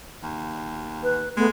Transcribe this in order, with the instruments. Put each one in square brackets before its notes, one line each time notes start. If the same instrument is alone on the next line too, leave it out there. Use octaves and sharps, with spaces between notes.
[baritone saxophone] D#2
[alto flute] B4
[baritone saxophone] G#3 [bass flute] A3 [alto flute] B3